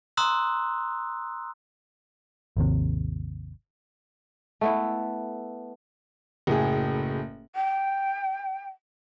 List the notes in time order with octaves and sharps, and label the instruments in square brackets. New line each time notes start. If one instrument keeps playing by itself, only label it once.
[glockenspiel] A#5 C6 D#6 E6 F#6
[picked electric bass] G#1 D#2 C3
[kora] A3 B3 E4
[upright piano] F#1 A2 G#4
[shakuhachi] G5